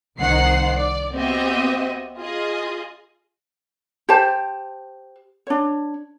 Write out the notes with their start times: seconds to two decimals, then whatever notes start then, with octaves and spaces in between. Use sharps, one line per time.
0.18 C2 D#3 C5 F#5 C7
0.75 D5
1.14 B3 C4 F#4 G4 D#5 E5
2.18 F4 G#4 D#5
4.09 G4 C5 A5
5.47 D4 C#5